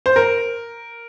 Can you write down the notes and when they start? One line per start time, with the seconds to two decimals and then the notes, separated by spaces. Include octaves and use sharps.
0.06 C5
0.16 A#4